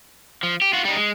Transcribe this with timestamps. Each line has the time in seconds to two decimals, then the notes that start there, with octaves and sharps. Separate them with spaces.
0.43 F3
0.62 G4
0.73 F4 F#4
0.85 G3 D#4
0.97 G#3